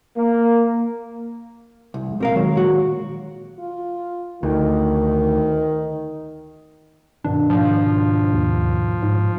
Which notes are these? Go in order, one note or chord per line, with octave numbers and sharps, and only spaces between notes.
A#3
C2
F2 G#3
A#2 C4 A#4 F5
D#3 F#3 G#3 C#5
A#2 F#4
F4
D2 D#3
G2 B2 D#3 D4
G#2 B2 D#3 F3
D#2
G#2